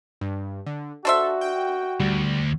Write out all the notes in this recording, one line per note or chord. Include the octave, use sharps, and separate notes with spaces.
G2
D3
D4 F#4 A4 C5 E5
G5
D2 G3